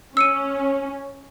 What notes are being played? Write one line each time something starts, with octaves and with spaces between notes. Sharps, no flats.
C#4 E6 C#7 D#7